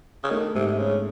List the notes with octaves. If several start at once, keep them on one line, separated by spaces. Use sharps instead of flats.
C#3
D#3 A3
G#2 C3
C3
C#3 C#4